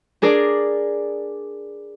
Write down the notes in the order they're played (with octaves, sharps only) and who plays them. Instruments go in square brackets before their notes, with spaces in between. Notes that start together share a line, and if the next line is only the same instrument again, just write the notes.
[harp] D4 G#4 A#4 D5